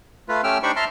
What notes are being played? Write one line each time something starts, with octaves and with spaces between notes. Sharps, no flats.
A3 F4 B4
A3 C#4 G4 G5 E6 F6
D4 D#4 G4 C5 B5 C#6
E5 A5 A#5 C6 F6